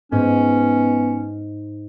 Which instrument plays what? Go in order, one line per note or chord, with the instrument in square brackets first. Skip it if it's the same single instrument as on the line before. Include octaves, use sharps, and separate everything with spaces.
[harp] G#2 [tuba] B3 [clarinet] C#4